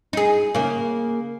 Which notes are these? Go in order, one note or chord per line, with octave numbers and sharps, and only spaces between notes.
D#4 G#4
C#3 A#3